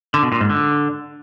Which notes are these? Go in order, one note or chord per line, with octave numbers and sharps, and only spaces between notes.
D3
B2
A#2
G#2
D3